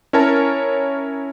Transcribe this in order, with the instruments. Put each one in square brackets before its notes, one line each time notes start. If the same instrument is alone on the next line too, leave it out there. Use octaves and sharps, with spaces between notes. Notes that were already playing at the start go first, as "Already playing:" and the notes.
[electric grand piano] C#4 E4 A#4 C#5 A5